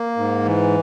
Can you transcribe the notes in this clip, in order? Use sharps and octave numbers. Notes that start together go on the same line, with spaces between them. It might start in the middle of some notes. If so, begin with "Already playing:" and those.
Already playing: A#3
G#2
E3